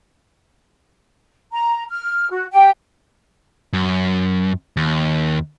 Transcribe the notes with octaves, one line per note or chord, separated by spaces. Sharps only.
A#5
F6
F#4
G4 G5
F#2
D#2